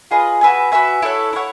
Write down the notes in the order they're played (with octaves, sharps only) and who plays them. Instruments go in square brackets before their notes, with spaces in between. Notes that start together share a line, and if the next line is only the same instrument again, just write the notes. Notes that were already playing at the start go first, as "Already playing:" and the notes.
[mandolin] F4 G#4 B4 D#5
F#4 B4 E5 G#5
F#4 B4 E5 G#5
E4 A4 C#5 F#5
E4 A4 C#5 F#5